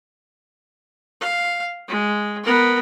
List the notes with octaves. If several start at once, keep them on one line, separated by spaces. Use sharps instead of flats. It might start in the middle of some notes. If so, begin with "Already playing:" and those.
F5
G#3
B3 A#4